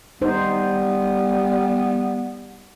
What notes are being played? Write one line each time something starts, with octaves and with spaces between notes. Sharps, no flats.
G3 B3 D#4 C5